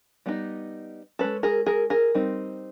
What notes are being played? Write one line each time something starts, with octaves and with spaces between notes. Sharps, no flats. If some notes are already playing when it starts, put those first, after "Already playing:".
G3 B3 D#4
G#3 C#4 A4 B4
G#4 A#4
G#4 A#4
G#4 A#4
G3 C4 D#4